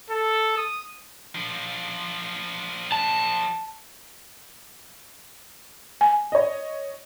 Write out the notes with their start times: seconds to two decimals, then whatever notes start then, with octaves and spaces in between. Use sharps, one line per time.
0.10 A4
0.57 D#6
1.35 F3 D4
2.92 A5
6.01 G#5
6.32 C#5 D#5